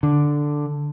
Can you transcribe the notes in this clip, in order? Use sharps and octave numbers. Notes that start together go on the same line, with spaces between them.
D3